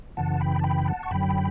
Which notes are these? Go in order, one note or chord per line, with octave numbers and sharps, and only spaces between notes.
F#2 C#3 E3 F#5 A5
G5 B5
A5
G5 B5
F#5 A5
C#6
F#2 D3 F#3 G5 B5